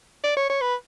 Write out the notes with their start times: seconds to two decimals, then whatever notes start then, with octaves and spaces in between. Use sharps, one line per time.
0.24 D5
0.37 C#5
0.50 C#5
0.61 B4